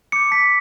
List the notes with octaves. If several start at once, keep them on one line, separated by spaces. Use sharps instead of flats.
D6 G6 C#7
A5 B6